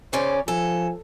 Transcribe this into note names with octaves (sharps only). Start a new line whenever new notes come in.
C#3 C#4 C5 D5
F3 A4 G#5